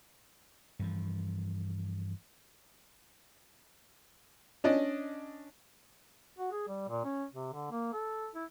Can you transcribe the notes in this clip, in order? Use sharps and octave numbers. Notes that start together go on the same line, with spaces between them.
G2 E3 F3
C#4 D4 D5 D#5
F#4
G#4
G3
A#2
C#4
C3
D3
A#3
A4
E4